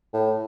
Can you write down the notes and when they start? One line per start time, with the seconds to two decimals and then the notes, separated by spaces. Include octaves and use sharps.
0.13 A2